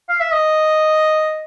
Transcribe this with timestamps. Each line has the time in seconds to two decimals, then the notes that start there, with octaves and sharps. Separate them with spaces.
0.09 F5
0.20 E5
0.32 D#5